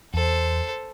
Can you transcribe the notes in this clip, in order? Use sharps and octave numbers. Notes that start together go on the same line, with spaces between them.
E2 A4 C5